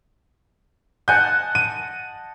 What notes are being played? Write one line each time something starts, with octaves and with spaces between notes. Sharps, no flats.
D#5 F#5 G#5 A5 G6
D#7